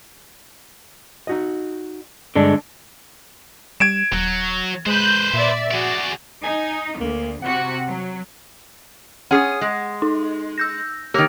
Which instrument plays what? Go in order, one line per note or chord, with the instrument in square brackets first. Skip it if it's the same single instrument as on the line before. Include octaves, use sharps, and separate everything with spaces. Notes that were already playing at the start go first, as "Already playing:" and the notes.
[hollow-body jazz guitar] D#4 F#4 D#5
[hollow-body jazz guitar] G2 [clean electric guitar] D3 G#3 D4
[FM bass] G3 [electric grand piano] G#6 D7 E7
[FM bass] D#1 [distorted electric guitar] F#3
[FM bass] G#3 [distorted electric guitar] B4 C5 [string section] F#6 G6
[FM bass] A#2 [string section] D5 E5
[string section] F#4 [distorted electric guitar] G#4 D5
[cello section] D#4 [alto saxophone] G#5
[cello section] D2 [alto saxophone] A#3
[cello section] C3 F#4 [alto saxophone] F#5
[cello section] F#3
[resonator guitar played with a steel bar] C#4 G#4 [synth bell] F#5 D#6
[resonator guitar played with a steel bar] G#3
[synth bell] D#4
E6 G6 A#6
[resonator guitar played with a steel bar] D#3 A#3 [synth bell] G4